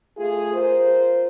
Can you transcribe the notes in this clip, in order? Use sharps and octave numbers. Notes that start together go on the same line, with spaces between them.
A3 F4 G#4
F4 A#4 C5